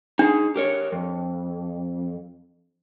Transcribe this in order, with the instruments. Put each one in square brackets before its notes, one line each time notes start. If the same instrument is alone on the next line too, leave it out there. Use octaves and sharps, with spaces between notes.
[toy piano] D4 [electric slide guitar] D#4 G#4
[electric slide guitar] G4 A#4 C#5
F2